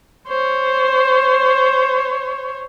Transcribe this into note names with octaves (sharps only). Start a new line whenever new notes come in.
C5 C#5